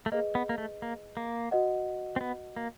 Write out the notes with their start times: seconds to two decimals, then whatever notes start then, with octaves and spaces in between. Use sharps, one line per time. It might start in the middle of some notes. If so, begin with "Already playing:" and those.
0.06 A3
0.12 A#3 G#4 B4 D#5
0.35 B3
0.49 A#3
0.58 A3
0.82 A#3
1.17 A#3
1.51 F#4 B4 D#5 F#5
2.16 C4
2.21 B3
2.56 A#3